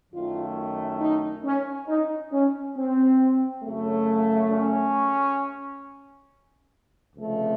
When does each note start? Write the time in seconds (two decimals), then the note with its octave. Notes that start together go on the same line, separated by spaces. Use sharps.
0.12 F#2 D#3 A3 F4
1.00 D#4
1.44 C#4
1.88 D#4
2.32 C#4
2.76 C4
3.64 F#2 C#3 F#3 A3
4.52 C#4
7.16 C#2 C3 F3 A3